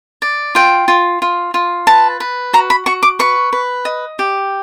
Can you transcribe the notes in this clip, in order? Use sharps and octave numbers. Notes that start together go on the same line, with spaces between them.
D5
F4 G5
F4
F4
F4
B4 A5
B4
F#4 A#5
B5
F#4 C#6
D6
B4 C#6
B4
D#5
G4